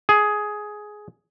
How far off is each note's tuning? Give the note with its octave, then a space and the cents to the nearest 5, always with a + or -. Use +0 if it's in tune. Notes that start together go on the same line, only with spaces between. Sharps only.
G#4 +10